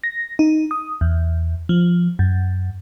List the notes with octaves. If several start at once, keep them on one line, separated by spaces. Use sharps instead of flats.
A#6
D#4
D#6
E2
F3
F#2